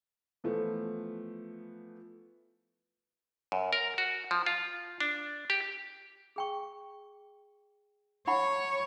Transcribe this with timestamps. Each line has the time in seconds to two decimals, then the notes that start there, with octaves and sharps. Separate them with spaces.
0.44 E3 F3 A3 B3
3.52 F#2
3.73 A#4
3.98 F#4
4.31 F3
4.46 F4
5.00 D4
5.50 G4
6.36 G#4 G5 C#6
8.27 E4 C#5 F#5 B5